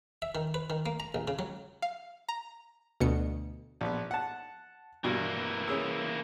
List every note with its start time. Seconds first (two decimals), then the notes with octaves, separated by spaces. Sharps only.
0.22 E5
0.35 D#3
0.54 B4
0.70 D#3
0.86 A#3
1.00 A#5
1.14 A#1
1.28 C#3
1.39 F#3
1.82 F5
2.29 A#5
3.00 D2 B2 C#7
3.81 A#1 B3
4.11 F#5 A5
5.04 G2 B2 E3 A#3
5.68 C#4 G#4 E6